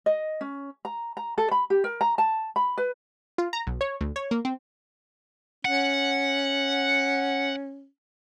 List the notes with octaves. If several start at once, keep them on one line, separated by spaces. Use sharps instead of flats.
D#5
C#4
A#5
A#5
A4
B5
G4
A#4
A#5
A5
B5
B4
F4
A#5
B1
C#5
D2
C#5
A#3
C4
C#4 F#5